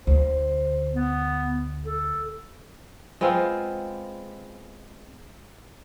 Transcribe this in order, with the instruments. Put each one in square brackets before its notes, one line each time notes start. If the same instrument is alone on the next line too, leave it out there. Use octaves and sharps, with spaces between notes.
[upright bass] D2 [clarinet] C5
[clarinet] B3
A4
[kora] G#3 B3 C4 F4